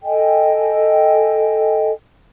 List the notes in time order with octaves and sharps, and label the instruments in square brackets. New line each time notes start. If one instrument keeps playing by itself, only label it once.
[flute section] A4 D#5 G5 G#5